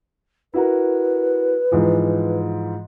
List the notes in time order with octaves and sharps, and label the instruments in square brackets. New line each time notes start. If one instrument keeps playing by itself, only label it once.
[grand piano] E4 F#4 A#4 [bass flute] B4
[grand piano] G#2 E3 F3